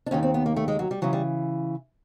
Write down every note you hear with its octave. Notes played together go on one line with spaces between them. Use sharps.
D4
D#2 D#3 C#4
C4
B3
A#3
A3
G#3
F#3
G3
C#3 E3 F#3
G3